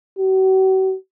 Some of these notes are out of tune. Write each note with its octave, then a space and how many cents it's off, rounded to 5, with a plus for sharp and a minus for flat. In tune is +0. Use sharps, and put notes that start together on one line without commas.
F#4 +45